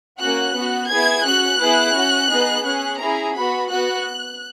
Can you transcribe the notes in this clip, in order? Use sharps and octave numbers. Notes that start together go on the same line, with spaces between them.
A#3 C#4 F#4 F#6
B3 F#4
B3 E4 G#4 G#6
C#4 F#4 F#6
B3 E4 G#4
C#4 F#4
B3 D#4 G#4
C#4 G#4 F#6
C#4 E4 G#4 A#5
B3 F#4 B5
B3 F#4 F#6